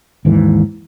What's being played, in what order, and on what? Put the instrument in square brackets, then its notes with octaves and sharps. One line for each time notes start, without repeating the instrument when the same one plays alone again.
[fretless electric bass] D#2 G#2 E3